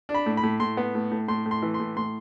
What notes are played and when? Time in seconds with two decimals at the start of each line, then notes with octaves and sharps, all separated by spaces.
0.09 D4
0.14 B5
0.26 A2
0.37 B5
0.43 A2
0.60 A2 C6
0.77 B3
0.95 A2
1.11 A2
1.28 A2 C6
1.46 A2
1.51 C6
1.62 E3
1.74 C6
1.80 A2
1.97 A2 C6